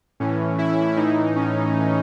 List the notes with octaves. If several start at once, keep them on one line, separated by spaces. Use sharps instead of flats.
A2 E3 C#4
E4
A2 E3 D#4
C#4